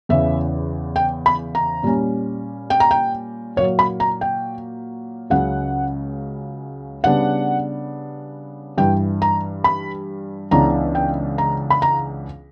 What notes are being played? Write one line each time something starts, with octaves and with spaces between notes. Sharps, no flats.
E2 C#3 E3 E5
G5
B5
A#5
A#2 G3 C#4
G5
A#5
G5
A#2 F#3 A#3 C#5
B5
A#5
G5
C#2 C#3 F#3 F#5
C#3 G3 B3 D4 F#5
G2 E3 G3 G5
A#5
B5
C#2 C#3 E3 B3 D4 A#5
G5
A#5
B5
A#5